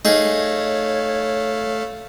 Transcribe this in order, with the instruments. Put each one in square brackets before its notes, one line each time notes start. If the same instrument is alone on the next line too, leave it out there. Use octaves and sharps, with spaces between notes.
[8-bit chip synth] A3 F5 [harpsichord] D#4 G#4 [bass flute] C#5